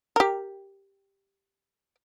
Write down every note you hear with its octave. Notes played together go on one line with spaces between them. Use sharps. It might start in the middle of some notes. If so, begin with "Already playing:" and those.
G4 A#4